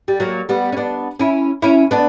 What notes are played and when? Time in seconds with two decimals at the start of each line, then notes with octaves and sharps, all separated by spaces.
0.08 G3
0.20 F#3 A#3
0.49 G3 B3
0.72 C#4
0.77 B3 D4
1.20 C#4 E4
1.62 C#4 E4
1.91 B3 D4